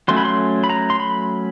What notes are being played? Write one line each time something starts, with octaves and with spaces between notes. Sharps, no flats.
F#3 A3 C#4 C6
B5
C6
B5
A#5
C6
B5